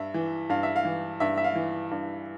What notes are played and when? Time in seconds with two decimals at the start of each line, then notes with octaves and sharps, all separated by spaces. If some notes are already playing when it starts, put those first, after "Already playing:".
Already playing: G2 E5
0.14 E3
0.50 G2 F5
0.63 E5
0.76 F5
0.85 E3
1.20 G2 E5
1.37 E5
1.44 F5
1.55 E3
1.91 G2